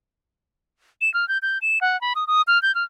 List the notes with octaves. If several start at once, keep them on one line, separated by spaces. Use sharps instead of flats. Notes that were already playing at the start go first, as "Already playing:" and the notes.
E7
F6
G6
G6
E7
F#5
B5
D#6
D#6
F6
G6
F6